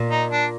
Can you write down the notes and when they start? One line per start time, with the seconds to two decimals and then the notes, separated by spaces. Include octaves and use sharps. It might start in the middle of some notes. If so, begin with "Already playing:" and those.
Already playing: A#2
0.10 D#4
0.31 D4